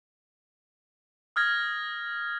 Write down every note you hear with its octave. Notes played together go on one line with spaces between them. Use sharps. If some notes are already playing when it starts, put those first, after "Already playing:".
D#6 F6 G#6 A#6